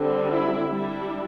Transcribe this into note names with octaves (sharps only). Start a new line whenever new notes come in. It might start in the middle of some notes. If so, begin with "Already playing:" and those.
Already playing: D3 G3 C4
E4
G3 D4 E4